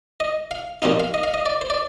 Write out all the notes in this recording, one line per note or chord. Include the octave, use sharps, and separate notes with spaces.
D#5
F5
A#2 F3 C4 D#4 F5
F5
D#5
F5
D#5
D5
C5
D5